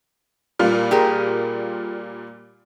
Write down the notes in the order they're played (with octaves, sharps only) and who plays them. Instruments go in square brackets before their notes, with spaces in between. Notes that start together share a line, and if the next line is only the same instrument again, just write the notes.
[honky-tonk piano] A#2 G3 F4
[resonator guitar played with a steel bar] G4 G#4 A#4